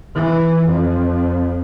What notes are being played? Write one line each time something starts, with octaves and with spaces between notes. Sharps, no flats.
E3
F2